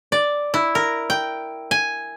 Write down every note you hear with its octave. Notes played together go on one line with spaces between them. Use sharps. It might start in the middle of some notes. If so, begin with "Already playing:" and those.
D5
E4
A#4
G5
G#5